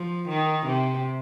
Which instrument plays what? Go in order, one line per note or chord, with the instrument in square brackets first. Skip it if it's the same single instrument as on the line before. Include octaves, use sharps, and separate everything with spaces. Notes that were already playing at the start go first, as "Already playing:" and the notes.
Already playing: [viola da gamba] F3
D#3
C3